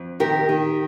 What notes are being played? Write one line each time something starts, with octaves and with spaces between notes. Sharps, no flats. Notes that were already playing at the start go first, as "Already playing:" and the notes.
Already playing: F2
D#3 G4 A#4
D#3